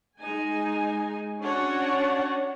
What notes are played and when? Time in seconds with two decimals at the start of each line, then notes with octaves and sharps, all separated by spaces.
0.20 G#3 D#4 G#5
1.40 C#4 D4 F#4 C#5 F#5